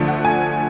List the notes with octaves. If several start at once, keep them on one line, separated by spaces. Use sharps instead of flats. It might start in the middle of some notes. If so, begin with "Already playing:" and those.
Already playing: D2 D3 F3 A3
F#5
G#5